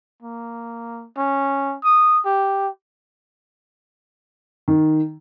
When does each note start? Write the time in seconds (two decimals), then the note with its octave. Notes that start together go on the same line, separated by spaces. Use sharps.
0.23 A#3
1.18 C#4
1.84 D#6
2.25 G4
4.68 D#3